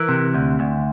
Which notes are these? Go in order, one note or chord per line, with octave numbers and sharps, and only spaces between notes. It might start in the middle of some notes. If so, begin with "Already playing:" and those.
Already playing: E3 A#4
C3
D2
D2